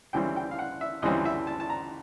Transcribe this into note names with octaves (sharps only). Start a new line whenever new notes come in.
D2 C#3 E3 G3 C4 G5
G5
F5
F#5
E5
D2 C#3 E3 G3 C4 D#5
E5
A5
A5
A#5